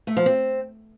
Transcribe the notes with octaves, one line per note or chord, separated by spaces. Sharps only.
A3
F3
C4